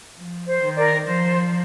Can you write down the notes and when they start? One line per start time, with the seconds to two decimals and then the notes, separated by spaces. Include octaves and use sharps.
0.17 F3
0.47 C5
0.62 D#3
0.76 A#4 D5
1.06 F3 C5